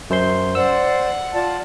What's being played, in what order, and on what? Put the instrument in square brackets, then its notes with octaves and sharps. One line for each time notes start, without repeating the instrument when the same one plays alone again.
[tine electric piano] F#2 C5 C6
[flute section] C5 D5 [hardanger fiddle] F#5 [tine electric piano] E6
[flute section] F4 D5 A5